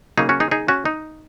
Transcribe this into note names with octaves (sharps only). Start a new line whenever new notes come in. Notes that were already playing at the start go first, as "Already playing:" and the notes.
C#3 F#3 A#3 D#4 G#4
C#4 F#4
D#4 G#4
D#4 G#4
C#4 F#4
D#4